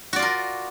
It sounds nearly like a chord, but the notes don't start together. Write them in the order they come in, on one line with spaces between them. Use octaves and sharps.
F#4 D5 F4 A#4